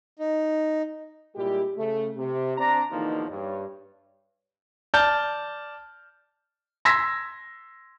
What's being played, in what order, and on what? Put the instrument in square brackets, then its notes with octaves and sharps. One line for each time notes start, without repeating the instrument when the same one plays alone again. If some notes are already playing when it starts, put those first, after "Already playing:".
[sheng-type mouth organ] D#4
[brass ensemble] A#2 G3 G#3 E4 G4
C#3 A3
C3
C4 D4 A#5
E2 B2 D3 F3 A#3 D#4
G2 C#5
[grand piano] D5 A5 F6 G6
[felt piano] C6 E6 G#6 A#6 B6